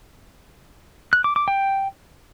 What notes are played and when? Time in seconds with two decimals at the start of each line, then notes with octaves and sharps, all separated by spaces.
1.13 F#6
1.24 D6
1.36 D6
1.48 G5